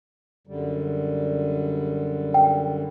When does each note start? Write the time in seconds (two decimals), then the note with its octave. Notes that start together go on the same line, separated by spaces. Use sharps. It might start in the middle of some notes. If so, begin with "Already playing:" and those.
0.47 F#2 D3 G3
2.34 G5